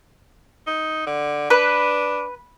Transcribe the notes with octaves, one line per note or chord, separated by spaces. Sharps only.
D#4
D3
D4 B4